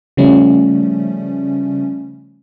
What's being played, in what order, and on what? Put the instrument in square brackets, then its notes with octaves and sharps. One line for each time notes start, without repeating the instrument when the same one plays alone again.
[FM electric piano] C#3 F3 G3 A3 C#4